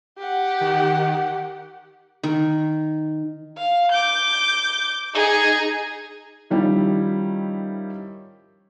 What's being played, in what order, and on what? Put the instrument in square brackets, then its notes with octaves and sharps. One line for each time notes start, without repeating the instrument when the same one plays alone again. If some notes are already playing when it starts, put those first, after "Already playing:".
[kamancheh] G4 F#5
[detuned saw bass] D#3
[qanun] D#3
[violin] F5
D6 G6
D#4 G#4
[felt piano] D#3 F3 G3 C#4 E4